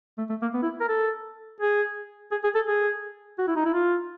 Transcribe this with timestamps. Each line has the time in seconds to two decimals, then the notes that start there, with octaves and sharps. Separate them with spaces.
0.18 A3
0.29 A3
0.42 A#3
0.54 B3
0.63 E4
0.80 A#4
0.89 A4
1.61 G#4
2.31 G#4
2.44 G#4
2.55 A4
2.67 G#4
3.38 F#4
3.48 E4
3.56 D#4
3.65 E4
3.73 F4